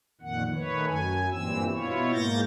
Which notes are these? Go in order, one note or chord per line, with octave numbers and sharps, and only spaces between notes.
F2 A#2 D#3 F#5
D#3 A3 B4 C#5
F#2 G#5
G2 A#2 E3 C4 E6
B2 E4 F4 C#5
G#2 A#3 G6 A6 A#6